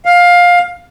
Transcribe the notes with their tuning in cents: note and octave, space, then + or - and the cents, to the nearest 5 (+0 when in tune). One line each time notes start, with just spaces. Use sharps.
F5 +15